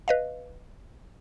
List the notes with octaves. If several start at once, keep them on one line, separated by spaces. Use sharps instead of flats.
B4 D#5 F5